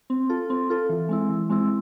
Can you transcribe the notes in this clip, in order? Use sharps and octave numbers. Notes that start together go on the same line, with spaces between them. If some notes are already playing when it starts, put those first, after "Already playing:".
C4
F4 A4
C4
F4 A4
E3
G#3 C4 E4
E3
G#3 C4 E4